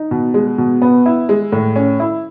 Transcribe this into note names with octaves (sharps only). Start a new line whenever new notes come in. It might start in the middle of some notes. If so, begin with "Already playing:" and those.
Already playing: D#4
B2
G#3
B2
B3
E4
G#3
A2
C#4
E4